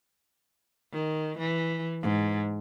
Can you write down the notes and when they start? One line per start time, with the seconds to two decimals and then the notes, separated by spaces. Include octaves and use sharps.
0.93 D#3
1.38 E3
2.02 G#2